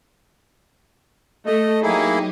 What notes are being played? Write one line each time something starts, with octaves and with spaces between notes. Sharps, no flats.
A3 D#5
F#3 A#3 D#4 E4 G4 G#4